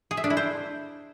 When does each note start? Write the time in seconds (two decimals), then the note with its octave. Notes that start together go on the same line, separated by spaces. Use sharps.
0.11 G#4
0.17 E5
0.24 D4
0.30 E4
0.37 C5